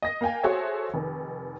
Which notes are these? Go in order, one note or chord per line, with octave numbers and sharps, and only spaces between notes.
D#5 A#6
A#3 F5 G5 G#5
F#4 G#4 A4 C5 C#5 E5
F1 D#3